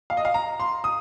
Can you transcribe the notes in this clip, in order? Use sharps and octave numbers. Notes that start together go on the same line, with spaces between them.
F5
D#5
F5
A#5
C6
D#6